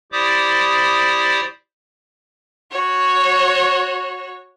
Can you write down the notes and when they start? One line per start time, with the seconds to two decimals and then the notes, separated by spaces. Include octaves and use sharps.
0.12 E4 G4 C5 D5 D6 D#6
2.71 F#4 C#5